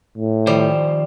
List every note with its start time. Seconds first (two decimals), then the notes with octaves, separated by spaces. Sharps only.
0.18 A2
0.47 D#3 F3 G3 C5